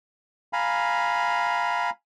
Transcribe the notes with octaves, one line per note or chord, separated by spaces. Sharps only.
F5 G#5 A#5 B5